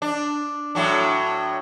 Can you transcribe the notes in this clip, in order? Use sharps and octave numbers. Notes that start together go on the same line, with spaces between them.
D4
A2 F#3 D4